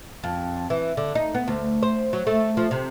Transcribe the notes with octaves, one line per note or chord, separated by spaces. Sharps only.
F2
E3
D3
D#4
B3
D2
C5
F#3
A3
F3
C3